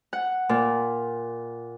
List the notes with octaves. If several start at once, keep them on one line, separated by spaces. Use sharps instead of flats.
F#5
A#2